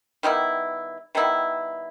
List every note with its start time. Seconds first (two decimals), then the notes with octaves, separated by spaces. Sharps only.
0.23 D#3 G3 B3 E4
1.15 D#3 G3 B3 E4